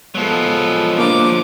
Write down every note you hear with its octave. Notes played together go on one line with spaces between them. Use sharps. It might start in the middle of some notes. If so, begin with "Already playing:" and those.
F3 F#3 G#3 B3 A4
A#3 D4 D6